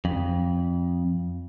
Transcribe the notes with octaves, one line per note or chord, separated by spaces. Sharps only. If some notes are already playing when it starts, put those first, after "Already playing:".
F2